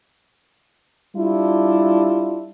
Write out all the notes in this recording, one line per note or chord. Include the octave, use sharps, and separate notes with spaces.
G3 D4 E4 F4